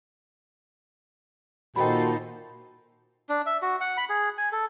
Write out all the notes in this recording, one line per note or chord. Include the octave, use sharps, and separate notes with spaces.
A#2 D#3 D#4 F#4 A4 C5 G5 B5
D4
E5
F#4
F#5
B5
G#4
G#5
A4